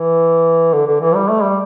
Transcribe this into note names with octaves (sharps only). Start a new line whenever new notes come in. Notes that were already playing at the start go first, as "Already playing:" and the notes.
Already playing: E3
D3
D3
E3
G3
A3
G3